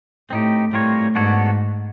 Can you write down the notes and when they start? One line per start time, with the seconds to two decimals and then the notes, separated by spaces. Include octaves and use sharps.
0.30 A2 C4 D#4 G4
0.73 A2 G3 C4 F4 A#4 C#5
1.15 G#2 B3 D4 F#4 A4 C#5